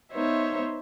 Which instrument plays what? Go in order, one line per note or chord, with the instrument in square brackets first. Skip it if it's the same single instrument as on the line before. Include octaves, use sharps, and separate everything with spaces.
[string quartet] B3 D#4 C5 C#5 E5